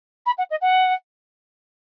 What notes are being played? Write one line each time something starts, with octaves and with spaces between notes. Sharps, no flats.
B5
F#5
D#5
F#5